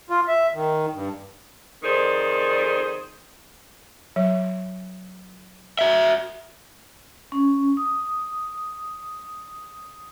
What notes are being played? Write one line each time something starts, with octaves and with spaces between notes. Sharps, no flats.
F4
E5
D#3
G2
F2 D#3 G#4 C5 D5
F#3 C#5
F#4 E5
C#4
D#6